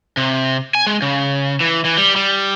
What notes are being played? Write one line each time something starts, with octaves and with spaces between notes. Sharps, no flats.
C3
G#5
G#3
C#3
E3
E3
G3
G3